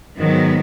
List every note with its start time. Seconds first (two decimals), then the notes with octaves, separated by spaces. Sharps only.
0.18 G#2 D#3 F#3 B3